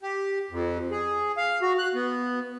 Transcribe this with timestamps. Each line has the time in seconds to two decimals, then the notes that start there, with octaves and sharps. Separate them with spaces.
0.02 G4
0.51 F2
0.91 G#4
1.37 F5
1.62 F#4
1.79 F#6
1.94 B3